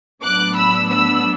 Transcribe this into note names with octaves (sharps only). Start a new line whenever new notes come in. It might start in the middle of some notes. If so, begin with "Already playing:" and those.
A2 F#3 B3 D4 D6 F#6
B5 E6
B5 E6